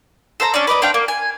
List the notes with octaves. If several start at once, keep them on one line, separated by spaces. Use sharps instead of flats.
A4 C5 E5 A#5
C#4 D4 D5
B4 D5 D#5 B5
C4 D4 F5 G5
A#3
G#5